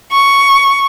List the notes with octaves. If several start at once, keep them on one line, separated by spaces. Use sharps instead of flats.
C#6